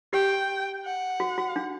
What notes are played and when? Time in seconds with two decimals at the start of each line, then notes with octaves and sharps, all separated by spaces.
0.13 G4 G5
0.84 F#5
1.20 F#4
1.38 F#4
1.56 D4